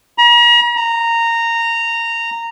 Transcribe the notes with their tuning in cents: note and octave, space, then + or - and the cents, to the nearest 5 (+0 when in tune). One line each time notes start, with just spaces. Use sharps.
A#5 +40
A#5 -15